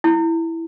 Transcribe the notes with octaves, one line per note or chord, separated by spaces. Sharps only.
E4